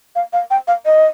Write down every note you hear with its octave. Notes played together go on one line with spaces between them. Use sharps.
F5
F5
G5
F5
D#5